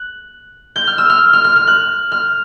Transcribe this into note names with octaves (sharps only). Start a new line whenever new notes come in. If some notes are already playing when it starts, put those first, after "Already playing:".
Already playing: F#6
G6
F6
E6
F6
F6
F6
F6
F#6
F6